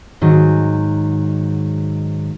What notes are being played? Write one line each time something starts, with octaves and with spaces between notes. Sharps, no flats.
G#2 D#3 F#3